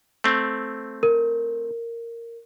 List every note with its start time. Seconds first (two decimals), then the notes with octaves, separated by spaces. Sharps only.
0.24 A3 C4
1.03 A#4